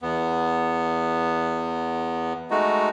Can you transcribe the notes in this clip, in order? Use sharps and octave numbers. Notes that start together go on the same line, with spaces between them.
E2 B3
G#3 A3 D#4 F#4